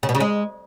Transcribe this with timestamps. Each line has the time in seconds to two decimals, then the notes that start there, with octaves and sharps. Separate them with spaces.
0.03 C#3
0.09 B2
0.15 C#3
0.20 G#3